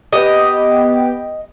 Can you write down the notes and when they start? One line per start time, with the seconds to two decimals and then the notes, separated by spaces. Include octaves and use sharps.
0.13 B3 G4 D#5